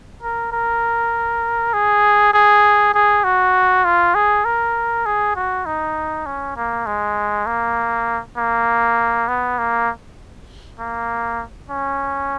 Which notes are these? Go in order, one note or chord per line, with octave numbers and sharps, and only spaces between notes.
A#4
A#4
G#4
G#4
G#4
F#4
F4
G#4
A#4
G#4
F#4
D#4
C#4
A#3
G#3
A#3
A#3
B3
A#3
A#3
C#4